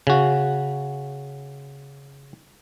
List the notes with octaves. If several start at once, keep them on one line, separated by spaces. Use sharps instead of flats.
C#3 F#4